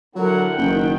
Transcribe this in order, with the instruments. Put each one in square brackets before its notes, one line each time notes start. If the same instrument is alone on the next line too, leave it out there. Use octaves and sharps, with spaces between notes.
[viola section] D3 E4 A#4 [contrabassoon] F#3 [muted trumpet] F#5
[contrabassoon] F#1 [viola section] D#3 G5